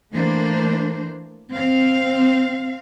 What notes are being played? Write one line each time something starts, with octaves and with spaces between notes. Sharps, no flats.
E3 A3 A#3 D4 C5
C4 F5